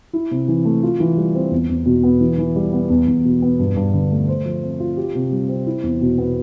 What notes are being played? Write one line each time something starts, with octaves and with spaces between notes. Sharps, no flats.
E4
C3
E3
A3
F4
E3
G3
C4
E2
E2
B2
B3
E3
E3
G3
B3
E2
E2
B2
B3
G2
G2
D3
A3
C5
F3
C4
F4
G4
C3
G3
C4
E4
E2
B2
B3